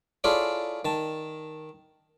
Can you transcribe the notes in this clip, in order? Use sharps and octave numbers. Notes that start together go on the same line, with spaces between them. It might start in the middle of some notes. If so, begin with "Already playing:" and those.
E4 F4 G#4 A4 C#5 D5
D#3 A5